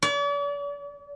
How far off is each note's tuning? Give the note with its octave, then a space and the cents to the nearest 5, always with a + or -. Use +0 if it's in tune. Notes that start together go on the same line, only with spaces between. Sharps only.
D5 -45